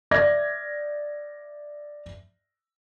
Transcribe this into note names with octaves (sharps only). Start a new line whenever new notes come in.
D5 E5 G#6 A#6